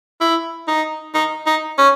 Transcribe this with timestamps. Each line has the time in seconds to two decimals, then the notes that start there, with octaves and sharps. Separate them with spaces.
0.21 E4
0.68 D#4
1.14 D#4
1.46 D#4
1.78 C#4